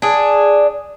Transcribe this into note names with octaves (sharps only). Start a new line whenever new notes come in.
D4 G#4